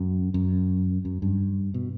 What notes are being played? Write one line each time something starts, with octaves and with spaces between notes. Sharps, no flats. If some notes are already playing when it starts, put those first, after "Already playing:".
Already playing: F#2
F#2
F#2
G2
B2